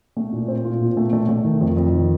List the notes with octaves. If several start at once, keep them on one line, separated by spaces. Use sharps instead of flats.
A3
A#2
C4
F4
A#2
A3
A3
A3
D#3
F2
F2
D#3